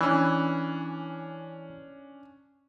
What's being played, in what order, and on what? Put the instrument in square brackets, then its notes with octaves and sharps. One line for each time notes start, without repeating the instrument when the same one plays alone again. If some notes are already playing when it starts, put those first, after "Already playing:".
[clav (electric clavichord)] E3 [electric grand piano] C#4 D4